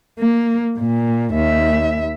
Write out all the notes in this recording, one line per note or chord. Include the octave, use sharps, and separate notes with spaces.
A#3
A#2
D#2 E5